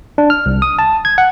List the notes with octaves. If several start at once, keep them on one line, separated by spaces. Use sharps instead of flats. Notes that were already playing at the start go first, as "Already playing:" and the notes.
D4
F6
C2
D#6
A5
G#6
F#5